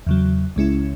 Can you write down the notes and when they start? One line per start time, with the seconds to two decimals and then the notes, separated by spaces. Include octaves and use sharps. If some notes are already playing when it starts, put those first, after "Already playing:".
0.07 E2 C#3 F#3
0.56 C#2 C#3 G#3 C#4 E4